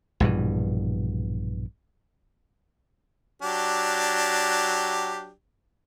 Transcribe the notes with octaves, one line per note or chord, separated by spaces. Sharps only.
A#1 G2 B2 E3
F#3 D4 G4